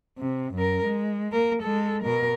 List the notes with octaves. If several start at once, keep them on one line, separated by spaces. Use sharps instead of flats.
C3
F#2 A#4
G#3
A#3 A#4
G#3 A4
B2 A#4